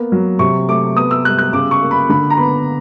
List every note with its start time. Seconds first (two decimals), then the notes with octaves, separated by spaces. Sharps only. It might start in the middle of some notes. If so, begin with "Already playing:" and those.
Already playing: A#3 B3
0.12 F#3
0.39 C3 C#6
0.68 A3 D6
0.96 B3 D#6
1.11 E6
1.24 G3 F#6
1.38 F#6
1.53 C#3 D6
1.71 C#6
1.82 A#3
1.91 B5
2.09 D3 B5
2.30 A#5
2.37 B3 B5